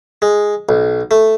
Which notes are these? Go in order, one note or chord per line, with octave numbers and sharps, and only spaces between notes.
G#3
B1
A3